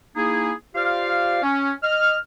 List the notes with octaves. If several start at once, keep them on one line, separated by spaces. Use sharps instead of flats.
A#3 D#4 E4 G#4
F4 G4 C5 D5 F5
C#4
D#5 F6